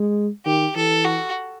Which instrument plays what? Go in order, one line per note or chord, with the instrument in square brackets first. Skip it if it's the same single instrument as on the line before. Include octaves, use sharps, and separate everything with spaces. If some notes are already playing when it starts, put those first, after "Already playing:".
Already playing: [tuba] G#3
[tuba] D#3 [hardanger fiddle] G4
[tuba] E3 [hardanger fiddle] A4
[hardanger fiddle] F#4